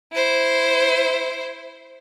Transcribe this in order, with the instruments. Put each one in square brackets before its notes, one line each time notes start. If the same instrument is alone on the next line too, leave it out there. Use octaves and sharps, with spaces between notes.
[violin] E4 C5